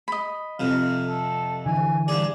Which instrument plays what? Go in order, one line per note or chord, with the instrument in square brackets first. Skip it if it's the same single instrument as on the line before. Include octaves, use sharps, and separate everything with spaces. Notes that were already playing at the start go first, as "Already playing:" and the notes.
[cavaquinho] D#5 B5
[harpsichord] F2 C3 [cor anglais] F5
[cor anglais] A4
[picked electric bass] D3 E3 [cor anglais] G#5
[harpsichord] G2 G#4 [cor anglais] D5